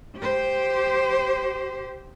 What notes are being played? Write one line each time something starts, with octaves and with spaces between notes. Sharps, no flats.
G4 C5